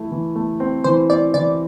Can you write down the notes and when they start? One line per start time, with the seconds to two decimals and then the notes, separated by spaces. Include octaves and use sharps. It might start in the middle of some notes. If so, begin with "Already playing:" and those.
Already playing: E3 A3 E4
0.11 E3
0.36 A3
0.60 C4
0.84 E3 C5
1.10 C4 D5
1.34 E3 D5